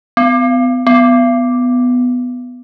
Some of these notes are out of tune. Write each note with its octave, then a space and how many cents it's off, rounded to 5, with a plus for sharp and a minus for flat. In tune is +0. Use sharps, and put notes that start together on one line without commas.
B3 +35
B3 +10